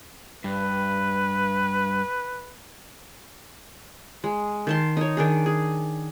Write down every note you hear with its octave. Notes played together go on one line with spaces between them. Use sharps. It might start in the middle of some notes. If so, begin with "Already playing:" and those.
G2 B4
G#3
D#3 A5 C6
D#4 C#5
D#3 D4 G#4
G#4